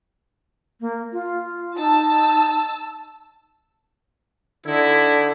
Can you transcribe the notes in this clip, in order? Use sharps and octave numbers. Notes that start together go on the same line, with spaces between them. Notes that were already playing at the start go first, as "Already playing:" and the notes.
A#3
F4
D#4 A5 E6
D3 D#4 E4